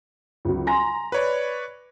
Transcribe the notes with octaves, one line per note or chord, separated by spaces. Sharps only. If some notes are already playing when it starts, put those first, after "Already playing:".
C#2 F#3
G#5 A#5 C6 A#6
B4 C#5 D5 B5